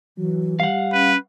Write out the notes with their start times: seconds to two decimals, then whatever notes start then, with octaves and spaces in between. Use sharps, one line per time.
0.18 E3 F#3
0.60 G3 F5 F#5
0.93 C#4 B4